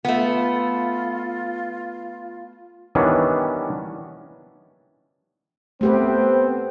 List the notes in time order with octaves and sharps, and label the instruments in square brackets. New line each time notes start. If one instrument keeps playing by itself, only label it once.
[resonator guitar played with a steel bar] A3 B3 [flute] F4
[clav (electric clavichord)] D#3 E3 G3 B3 C#4 D4
[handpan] A3 G4 B4 [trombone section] B3 C4